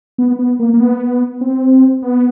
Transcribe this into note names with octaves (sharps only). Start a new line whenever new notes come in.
B3
B3
A#3
A#3
B3
C4
B3